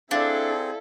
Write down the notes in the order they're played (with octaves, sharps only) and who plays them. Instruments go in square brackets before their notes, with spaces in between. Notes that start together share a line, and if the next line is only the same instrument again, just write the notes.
[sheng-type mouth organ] C4 G#4 [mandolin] D4 [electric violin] E4 A4 [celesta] D5 E5 F5